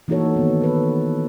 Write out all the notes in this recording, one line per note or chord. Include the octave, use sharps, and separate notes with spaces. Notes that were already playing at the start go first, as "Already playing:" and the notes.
E3 A#3 D#4 F#4 A4 C#5
D#3 B3
A4 B4